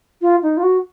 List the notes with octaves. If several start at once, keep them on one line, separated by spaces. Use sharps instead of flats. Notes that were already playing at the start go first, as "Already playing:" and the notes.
F4
D#4
F4
F#4